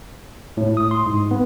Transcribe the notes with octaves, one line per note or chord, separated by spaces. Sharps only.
A2
D#6
C6
G#2
B3